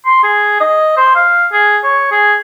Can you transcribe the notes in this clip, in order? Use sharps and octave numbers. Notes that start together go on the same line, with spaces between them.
C6
G#4
D#5
C5
F5
G#4
C#5
G#4